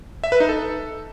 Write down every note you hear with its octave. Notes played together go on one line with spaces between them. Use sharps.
E5
B4
D#4
A4